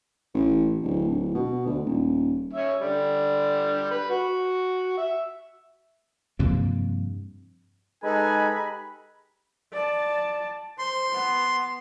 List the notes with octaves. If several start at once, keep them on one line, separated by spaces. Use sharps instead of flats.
A1
D1
D1
B2
D2
D#1
C#4 E5
D3 G3
B4
F#4
E5
G2 C3 F3 A#3
G#3 D#4 G4 A4 B4 G#5 A#5 B5
D5 A5
C5 C6
B3